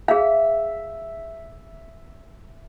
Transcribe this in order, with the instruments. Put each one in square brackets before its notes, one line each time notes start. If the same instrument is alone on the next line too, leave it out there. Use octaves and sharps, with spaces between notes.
[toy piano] G#4 F5 [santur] E5